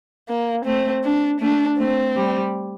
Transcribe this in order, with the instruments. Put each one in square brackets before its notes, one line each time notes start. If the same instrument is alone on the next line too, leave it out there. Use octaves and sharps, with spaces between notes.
[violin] A#3
[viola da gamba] A3 [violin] C4
[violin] D4
[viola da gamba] A3 [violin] D4
[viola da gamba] A3 [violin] C4
[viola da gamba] G3